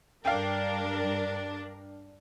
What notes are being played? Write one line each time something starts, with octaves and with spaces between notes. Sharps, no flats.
G2 D4 A#4 F5 G5